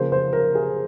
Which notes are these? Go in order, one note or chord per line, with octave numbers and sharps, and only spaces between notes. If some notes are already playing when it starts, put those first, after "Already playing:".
Already playing: C#3 F3 A#3 C5
C5
A#4
G#4